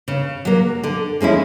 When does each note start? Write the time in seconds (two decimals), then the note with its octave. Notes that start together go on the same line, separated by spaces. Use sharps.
0.08 C#3
0.45 F#3 A#3
0.84 D3
1.21 F3 G#3 C#4 E4